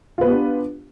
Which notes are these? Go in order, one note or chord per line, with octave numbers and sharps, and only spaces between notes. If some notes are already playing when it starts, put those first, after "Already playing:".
B3 D4 F4 G4 B4